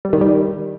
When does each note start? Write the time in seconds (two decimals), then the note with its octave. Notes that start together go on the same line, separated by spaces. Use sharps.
0.05 G3
0.13 D#3
0.21 G3